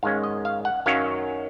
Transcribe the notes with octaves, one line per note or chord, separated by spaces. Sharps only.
G#2 D#3 G#3 C#4 F5
D#5
F5
F#5
F#2 D#3 F#3 C#4 F5